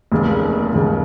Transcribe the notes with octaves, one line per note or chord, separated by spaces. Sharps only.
F1 D#2 C#3 G#3
F1 D#2 C#3 G#3